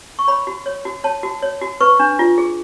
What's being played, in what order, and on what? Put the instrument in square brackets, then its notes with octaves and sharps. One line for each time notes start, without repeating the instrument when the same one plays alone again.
[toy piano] C#6
C#5 B5
F#4
C#5
F#4
C#5 A5
F#4
C#5
F#4
B4 C#6
D4
F4
G#4